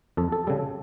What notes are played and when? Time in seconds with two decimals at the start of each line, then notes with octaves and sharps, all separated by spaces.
0.17 F2 A4
0.32 A4
0.47 C#3 G3 A4